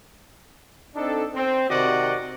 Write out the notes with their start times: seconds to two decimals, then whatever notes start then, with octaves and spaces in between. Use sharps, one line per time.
0.96 C4 D4 D#4 A4
1.35 C4
1.70 C3 D#3 F#4 D5 D#5 F#5